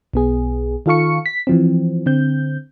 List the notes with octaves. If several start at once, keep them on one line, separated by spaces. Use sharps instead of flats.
B1 B3 G#4
D#3 F4 A4 F5 C#6 C#7
B6
E3 F3 C4
D3 C4 G6